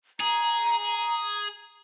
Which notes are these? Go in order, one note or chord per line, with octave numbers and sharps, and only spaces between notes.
G#4 A#5